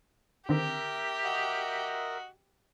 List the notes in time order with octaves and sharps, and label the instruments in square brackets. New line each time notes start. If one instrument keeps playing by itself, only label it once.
[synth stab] D3 D#3 C4 [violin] G4 [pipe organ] A#4 E5
[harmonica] F#4 D#5